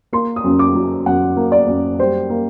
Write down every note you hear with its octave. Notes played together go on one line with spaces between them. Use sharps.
A#3 C6
D#6
F#2
D6
F#3
F#2 F#5
A#3
D5
F#2
G3 C5
A#3